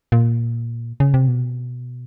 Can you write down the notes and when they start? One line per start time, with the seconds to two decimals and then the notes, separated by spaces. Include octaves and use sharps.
0.12 A#2
1.00 C#3
1.14 C3
1.28 B2